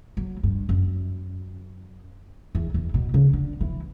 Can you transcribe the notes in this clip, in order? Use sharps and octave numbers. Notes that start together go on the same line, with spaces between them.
F#3
G2
F#2
E2
E2
B2
C#3
D3
E3